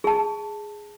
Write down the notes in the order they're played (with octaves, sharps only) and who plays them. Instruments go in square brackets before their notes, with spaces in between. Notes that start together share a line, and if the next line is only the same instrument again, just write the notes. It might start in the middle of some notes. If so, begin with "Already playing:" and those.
[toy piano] G#4 A5